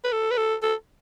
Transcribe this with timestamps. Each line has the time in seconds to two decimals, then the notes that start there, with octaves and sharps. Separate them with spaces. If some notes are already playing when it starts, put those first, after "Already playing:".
0.04 B4
0.12 A4
0.31 B4
0.37 A4
0.63 A4